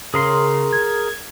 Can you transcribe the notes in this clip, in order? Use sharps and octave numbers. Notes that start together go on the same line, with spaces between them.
C#3 G#4 A#4 C6
G#6